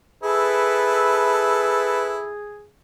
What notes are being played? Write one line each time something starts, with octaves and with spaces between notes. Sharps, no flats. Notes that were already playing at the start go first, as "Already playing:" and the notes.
E4 G#4 A4 B4